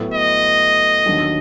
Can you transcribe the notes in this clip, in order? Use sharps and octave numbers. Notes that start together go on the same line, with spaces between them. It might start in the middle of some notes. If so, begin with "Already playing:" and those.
Already playing: A2 F#3 B3
D#5
D#2 D3 F#3